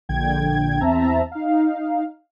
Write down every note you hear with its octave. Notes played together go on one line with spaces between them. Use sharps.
A#1 D3 G5 G#6
E2 C4 E5 A5 A#5
D#4 F5